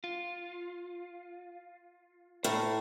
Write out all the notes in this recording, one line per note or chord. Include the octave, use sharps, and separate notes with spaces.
F4
A2 E5 A#5